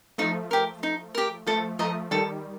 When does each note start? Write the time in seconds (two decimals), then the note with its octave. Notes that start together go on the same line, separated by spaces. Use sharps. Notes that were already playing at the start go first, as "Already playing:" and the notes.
0.18 F3 A3 D#4
0.51 G4 A#4
0.83 D#4
1.15 G4 A#4
1.47 F3 A3 A4
1.79 F3 A3 D#5 A#5
2.11 D#3 G3 A4